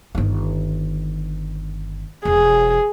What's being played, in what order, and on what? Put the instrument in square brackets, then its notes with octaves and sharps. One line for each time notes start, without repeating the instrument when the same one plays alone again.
[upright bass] G1 D#3
[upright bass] E1 [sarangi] G#4